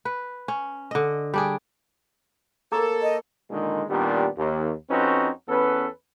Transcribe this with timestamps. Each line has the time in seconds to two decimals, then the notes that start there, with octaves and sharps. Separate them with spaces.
0.05 B4
0.48 C#4
0.91 D3 D#5
1.34 G3 D4 G#4
2.72 A#3 G#4 A4 C#5 A#5 D6
3.01 D#5
3.50 A#2 D3 D#3 G#3
3.90 A#2 D#3 G3 B3 D4 G4
4.38 D#2
4.91 F2 C4 C#4 D#4 F#4 B4
5.48 E2 B3 C#4 A4 B4